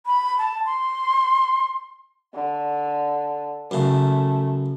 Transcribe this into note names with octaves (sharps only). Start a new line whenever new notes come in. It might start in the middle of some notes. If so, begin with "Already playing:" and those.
B5
A5
C6
D3
F#2 C#3 A3